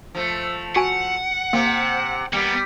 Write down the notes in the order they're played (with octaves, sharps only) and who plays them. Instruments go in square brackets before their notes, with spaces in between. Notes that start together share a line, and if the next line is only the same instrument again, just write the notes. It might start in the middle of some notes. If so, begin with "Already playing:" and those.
[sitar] F3 A3
[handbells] F#4 G#5 D7 [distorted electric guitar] F#5
[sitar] C3 C4 [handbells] A#3 C#7
[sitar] G3 [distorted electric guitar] A#3 B3 [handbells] C#7